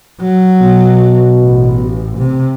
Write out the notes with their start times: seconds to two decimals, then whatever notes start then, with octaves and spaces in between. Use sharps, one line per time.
0.21 F#3
0.62 B2
1.42 A1
2.18 C3